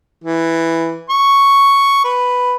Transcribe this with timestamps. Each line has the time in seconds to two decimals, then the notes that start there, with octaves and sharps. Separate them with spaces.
0.24 E3
1.10 C#6
2.04 B4